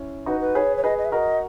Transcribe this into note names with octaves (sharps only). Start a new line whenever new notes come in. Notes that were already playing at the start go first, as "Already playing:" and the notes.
Already playing: C#4 E4
D#4 F#4 B4
B4
G#4 B4 C#5
C#5
G#4 B4 D#5
D#5
E5
F#4 A#4 D#5